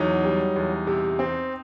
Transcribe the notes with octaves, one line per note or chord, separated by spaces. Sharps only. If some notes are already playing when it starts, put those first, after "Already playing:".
Already playing: E2 F#3 D#4
G3
E2
C3
C4